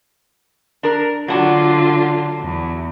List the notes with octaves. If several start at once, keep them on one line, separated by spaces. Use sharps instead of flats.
D4 A#4
D3 F#3 D4 F4 F#4
E2